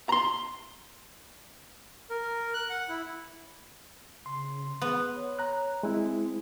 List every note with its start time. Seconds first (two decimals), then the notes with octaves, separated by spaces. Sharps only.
0.09 A#5 C6
2.10 A#4
2.54 F#6
2.70 F#5
2.89 E4
4.26 C#3 C6
4.81 B3 G#4
5.14 C#5
5.39 A#5 F#6
5.83 G#3 C4 E4